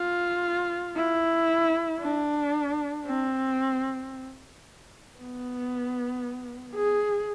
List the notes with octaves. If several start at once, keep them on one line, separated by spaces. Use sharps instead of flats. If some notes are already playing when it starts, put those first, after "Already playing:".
Already playing: F4
E4
D4
C4
B3
G#4